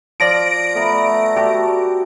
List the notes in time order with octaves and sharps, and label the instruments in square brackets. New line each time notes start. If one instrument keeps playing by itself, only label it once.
[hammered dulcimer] F3 [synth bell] D5 A#6 D7
[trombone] A3 [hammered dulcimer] B3 A#5
[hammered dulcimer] F#4 G4 A4